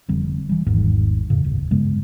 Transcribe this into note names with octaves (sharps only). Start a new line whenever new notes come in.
F1 D3 G3 C4
E3 G3
G#1 E2 G#2 D#3
F2 A2 C#3
D#1 A1
G2 C#3 G#3 B3